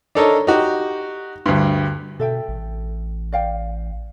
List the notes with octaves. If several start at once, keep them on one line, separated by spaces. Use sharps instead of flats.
D4 D#4 A4 A#4 C#5 D#5
D#4 F#4 G4
D2 G2
B2 A4 E5 G5
A1
D5 F5 G5